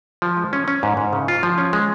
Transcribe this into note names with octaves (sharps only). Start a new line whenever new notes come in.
F3
G#3
C#4
C#4
G#2
G#2
C#3
F4
F3
C#4
G#3